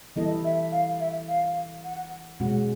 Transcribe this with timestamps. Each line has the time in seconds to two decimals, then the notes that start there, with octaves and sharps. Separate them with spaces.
0.16 E3 G3 B3 E4 A4 D#5
0.44 E5
0.72 F5
1.00 E5
1.28 F5
1.84 F#5
2.40 B2 G#3 C#4 F#4 F#5